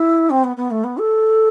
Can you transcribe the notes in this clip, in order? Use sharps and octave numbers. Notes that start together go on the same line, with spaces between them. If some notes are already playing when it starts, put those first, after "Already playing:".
Already playing: E4
C4
B3
B3
A3
B3
A4